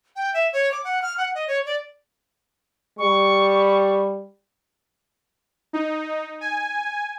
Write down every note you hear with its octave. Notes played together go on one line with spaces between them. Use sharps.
G5
E5
C#5
D6
F#5
F6
F#5
D#5
C#5
D5
G3 C#6
D#4
G#5